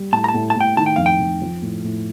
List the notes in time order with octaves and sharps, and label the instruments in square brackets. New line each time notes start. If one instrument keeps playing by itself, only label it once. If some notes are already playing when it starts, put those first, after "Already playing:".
Already playing: [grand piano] G3
[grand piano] A2 [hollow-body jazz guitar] A5
[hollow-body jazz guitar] A#5
A5
[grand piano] A2
[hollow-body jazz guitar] A5
[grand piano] A2
[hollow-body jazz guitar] G5
[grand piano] D#3 [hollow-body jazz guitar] A5
[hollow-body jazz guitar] G5
[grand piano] F2 [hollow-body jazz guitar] F5
[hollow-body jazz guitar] G5
[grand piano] F2
F3
A2
A2